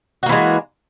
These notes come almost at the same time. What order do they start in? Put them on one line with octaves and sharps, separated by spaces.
F#4 A#3 E3 G#3